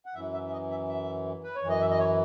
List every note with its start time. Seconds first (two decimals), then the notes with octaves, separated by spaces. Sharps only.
0.06 F#5
0.15 F#2 E3 E5
0.33 E5
0.47 E5
0.52 D#5
0.70 E5
0.89 E5
1.44 B4
1.56 C#5
1.62 F#2 E3
1.69 D#5
1.81 E5
1.91 D#5
1.99 C#5